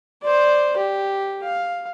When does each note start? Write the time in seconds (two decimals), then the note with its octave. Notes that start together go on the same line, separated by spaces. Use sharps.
0.23 C5 D5
0.77 G4
1.44 F5